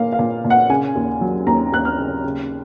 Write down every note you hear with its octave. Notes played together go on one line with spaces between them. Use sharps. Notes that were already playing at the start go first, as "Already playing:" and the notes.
Already playing: A#2 A#3 F5
F5
A#2
A#2
F#5
C#3 G#5
D#2
F#3
D#2 A#5
D#2 F#6
F6
C#3
C#3